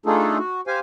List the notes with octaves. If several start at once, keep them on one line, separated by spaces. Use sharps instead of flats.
A3 D4 D#4 F4 G#4 A4
F#4
G4 C5 F5 G#5